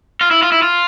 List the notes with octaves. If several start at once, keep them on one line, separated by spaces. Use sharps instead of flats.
F4
E4
F4
E4
F4